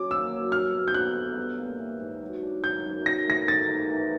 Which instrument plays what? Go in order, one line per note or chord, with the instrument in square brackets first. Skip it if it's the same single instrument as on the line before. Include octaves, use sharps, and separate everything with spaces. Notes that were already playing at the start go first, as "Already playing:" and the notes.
Already playing: [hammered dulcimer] F#3 C#4 [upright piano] D6
[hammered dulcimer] A#3 [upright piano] E6
[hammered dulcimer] F#3
[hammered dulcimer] G3 [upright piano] F6
[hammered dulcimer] B2
[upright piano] G6
[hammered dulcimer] D3 [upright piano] F#6
[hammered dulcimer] B3
G3
A#2
E3
G#2
F#3
D4
[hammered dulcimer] D#3 [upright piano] G6
[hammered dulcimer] F#2
[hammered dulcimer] D#3 [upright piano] A#6
[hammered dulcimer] A3 [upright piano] A#6
[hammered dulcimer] G3 [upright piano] A6
[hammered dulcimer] D#3
E3